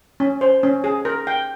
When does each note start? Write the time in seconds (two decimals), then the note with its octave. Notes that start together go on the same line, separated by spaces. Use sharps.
0.20 C#4
0.41 C5
0.63 C#4
0.84 G#4
1.05 A#4
1.27 G5